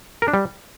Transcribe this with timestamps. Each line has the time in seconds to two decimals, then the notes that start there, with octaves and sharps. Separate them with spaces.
0.22 A#4
0.28 D4
0.34 G3